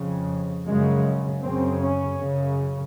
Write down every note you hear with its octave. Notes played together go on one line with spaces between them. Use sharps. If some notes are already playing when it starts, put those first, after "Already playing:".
Already playing: F2 C#3
F#2 C#3 G#3
F#2 C#3 C4
C#4
F#2 C#3